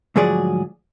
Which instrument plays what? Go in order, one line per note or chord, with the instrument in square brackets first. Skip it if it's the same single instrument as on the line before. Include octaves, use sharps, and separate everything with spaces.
[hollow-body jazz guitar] D2 G#2 F3 F#3 G#4 D5